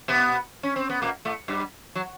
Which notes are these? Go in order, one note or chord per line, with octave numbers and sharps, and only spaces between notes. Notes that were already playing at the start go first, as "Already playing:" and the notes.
B2 B3
C#4
C4
B3
A#2 A#3
A2 A3
G2 G3
F#3